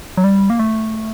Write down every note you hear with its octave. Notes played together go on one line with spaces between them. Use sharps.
F#3
G3
A#3
A3